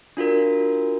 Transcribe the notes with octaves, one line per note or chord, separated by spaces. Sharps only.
D4 F4 F#4 A#4